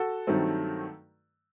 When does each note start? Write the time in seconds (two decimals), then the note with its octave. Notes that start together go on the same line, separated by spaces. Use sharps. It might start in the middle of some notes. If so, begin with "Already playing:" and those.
Already playing: F#4 A4
0.27 G2 D#3 F#3 A3 C4